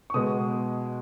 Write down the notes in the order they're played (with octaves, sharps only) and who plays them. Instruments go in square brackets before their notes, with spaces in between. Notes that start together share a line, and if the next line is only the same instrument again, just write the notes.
[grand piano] C#6
B2 G#3 B3 D#6